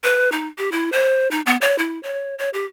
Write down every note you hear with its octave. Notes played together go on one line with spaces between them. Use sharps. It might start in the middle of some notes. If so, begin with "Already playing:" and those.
B4
D#4
G4
E4
C5
D#4
B3
C#5
E4
C#5
C#5
G4